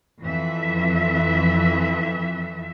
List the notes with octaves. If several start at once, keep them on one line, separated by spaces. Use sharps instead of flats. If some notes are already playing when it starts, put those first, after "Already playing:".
F2 E3 E5